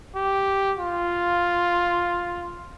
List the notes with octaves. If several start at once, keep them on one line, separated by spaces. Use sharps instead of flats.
G4
F4